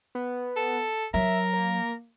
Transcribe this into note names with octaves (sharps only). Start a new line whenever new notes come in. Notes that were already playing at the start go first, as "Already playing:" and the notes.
B3
A4
F#3 A#4 E5
A#3